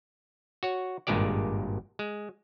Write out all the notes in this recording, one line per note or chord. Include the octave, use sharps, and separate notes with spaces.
F#4 C#5
G#1 G2 A#2 G#3 G4 D5
G#3